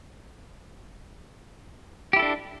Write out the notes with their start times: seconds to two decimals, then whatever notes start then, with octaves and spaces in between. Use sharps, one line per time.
2.13 G4
2.16 E4
2.19 A4
2.22 D4